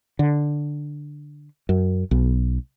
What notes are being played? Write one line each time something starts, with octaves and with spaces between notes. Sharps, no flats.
D3
F#2
B1